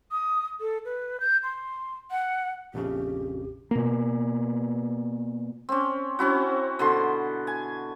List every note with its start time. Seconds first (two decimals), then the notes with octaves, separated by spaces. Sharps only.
0.11 D#6
0.61 A4
0.85 B4
1.20 G6
1.43 C6
2.11 F#5
2.74 A#1 F2 C#3 G4
3.71 B2 A#3
5.69 C4 C#4
6.19 C4 C#4 E4 F#4
6.79 B2 D3 C6
7.47 G#5